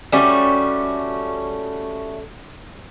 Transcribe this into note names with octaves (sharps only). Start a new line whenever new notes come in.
G3 A3 C#4 F#4